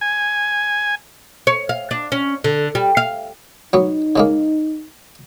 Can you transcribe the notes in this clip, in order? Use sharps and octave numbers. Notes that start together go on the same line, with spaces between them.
G#5
C#5
F5
D4
C#4
D3
G3
F5
F#3 B3 D#4
C#3 G#3 A#3